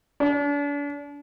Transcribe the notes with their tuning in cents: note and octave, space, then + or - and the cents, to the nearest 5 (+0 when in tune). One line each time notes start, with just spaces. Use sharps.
D4 -40